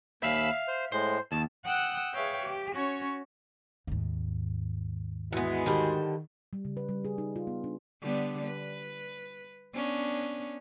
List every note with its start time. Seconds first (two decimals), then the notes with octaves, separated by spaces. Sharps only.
0.23 D#2 E5 F5 B5 E6
0.68 C5
0.92 A2 G#3 C5
1.32 D#2 A5
1.64 F#5 G5 D#6 E6 F#6
2.14 G#4 B4 C#5 E5 F5 G5
2.42 G4
2.74 C#4 F#4 C#5
3.87 D#2 G#2
5.32 E3 G#3 B3 E4 F#4
5.66 D3 D#3 G3 C5
6.53 G3
6.65 C#3
6.77 B4
6.89 G3
7.05 G#4
7.18 D#4
7.36 F4
7.47 B3
7.64 D4
8.03 D3 G3 B3
8.46 B4
9.75 B3 C#4 D4